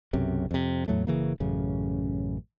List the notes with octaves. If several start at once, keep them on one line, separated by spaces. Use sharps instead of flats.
B1 F#2 C3
F2 C3
E2 A2 F#3 A3
F#1 C#3 E3 A#3
A1 F#2 C#3